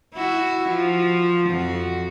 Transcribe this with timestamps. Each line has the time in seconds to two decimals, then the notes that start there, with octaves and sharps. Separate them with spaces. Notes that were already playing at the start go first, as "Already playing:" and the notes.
0.14 E4 F#4
0.69 F3
1.50 F2 F#4